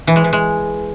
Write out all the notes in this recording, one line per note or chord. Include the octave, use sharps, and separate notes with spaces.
E3
G#3
E3
G#3